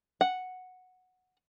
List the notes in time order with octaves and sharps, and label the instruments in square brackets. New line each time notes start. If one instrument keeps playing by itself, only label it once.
[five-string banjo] F#5